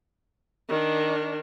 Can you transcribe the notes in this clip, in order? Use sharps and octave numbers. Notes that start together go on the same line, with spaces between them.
D#3 D4